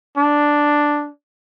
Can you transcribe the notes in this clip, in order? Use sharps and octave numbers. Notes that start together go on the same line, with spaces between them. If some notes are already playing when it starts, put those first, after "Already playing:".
D4